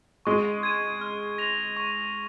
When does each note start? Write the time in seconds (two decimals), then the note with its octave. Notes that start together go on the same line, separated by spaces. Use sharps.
0.26 G#3 C#6
0.63 G#6 D#7
1.01 F6
1.38 A#6 F7
1.77 C#6